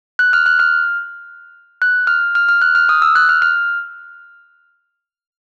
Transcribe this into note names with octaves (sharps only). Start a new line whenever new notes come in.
F#6
F6
F#6
F6
F#6
F6
F6
F6
F#6
F6
D#6
E6
F#6
F6
F6